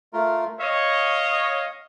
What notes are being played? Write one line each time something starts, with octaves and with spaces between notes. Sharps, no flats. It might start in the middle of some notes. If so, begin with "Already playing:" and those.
A3 F4 A#4
C#5 D#5 F5